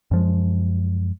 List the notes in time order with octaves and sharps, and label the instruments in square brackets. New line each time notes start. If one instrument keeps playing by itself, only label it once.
[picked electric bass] F#2 F3 G#3